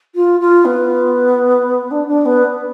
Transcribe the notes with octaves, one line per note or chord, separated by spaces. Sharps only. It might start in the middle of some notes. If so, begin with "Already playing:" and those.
F4
F4
B3
D4
D4
B3